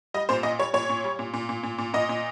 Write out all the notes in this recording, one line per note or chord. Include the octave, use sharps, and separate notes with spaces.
G3 D#5
A#2 C5
A#2 D#5
G3 C#5
A#2 C#5
A#2
G3
A#2
A#2
A#2
A#2
A#2
A#2 D#5
A#2